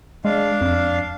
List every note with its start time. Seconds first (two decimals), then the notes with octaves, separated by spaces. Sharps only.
0.25 G#3 D4 F5
0.61 F2